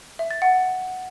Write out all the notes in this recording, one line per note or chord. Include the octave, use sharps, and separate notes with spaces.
E5
A6
F#5